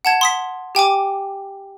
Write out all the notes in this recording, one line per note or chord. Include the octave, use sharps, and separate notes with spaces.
F#5 A5 G#6
C6 D#6 B6
G4 G5 G#5 D6